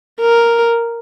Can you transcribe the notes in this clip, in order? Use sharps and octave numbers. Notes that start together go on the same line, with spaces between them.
A#4